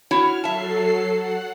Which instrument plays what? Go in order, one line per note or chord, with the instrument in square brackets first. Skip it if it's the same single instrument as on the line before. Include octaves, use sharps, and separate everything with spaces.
[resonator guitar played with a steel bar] E4 F#4 C#5 [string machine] F6
[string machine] F#3 A4 C7 [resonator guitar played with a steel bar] E5 A5
[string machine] F#5